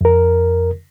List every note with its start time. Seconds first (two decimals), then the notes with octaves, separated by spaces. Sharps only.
0.01 F2 A#4